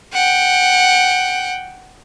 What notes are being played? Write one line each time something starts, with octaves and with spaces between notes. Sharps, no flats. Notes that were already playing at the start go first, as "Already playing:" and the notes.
F#5 G5